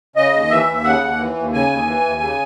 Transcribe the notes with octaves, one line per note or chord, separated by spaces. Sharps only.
C#3 D#5
D#2
E3 E5
D#2
C#3 F#5
D#2
E3
D#2
C#3 G#5
D#2
E3
D#2
C#3